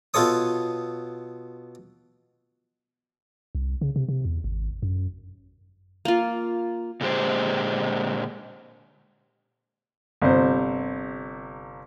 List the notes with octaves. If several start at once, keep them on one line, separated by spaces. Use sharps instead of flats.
B2 F4 A4 C#5 D#6
C2
C#3
C3
C3
E2
G#1
F#2
A#3 F4
A#2 D3 G#3 G4 C5
G1 C3 C5